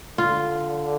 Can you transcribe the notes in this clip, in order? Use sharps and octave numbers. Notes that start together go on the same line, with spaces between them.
D3 F4